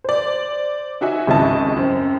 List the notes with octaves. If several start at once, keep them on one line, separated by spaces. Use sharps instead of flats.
C5 D5
D#4 F#4 E5 G#5
G#1 C#2 C#4 E4 D#5 A5
F#2 C4